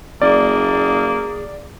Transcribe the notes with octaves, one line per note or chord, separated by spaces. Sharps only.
F#1 A#3 G#4 D5